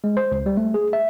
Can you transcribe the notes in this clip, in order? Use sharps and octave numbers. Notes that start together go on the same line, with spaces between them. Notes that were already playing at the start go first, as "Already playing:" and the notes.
G#3
C5
C#2
G3
A3
G#4
E5